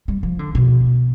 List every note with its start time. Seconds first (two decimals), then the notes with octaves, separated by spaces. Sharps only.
0.08 G3
0.23 F3
0.39 D3
0.55 B2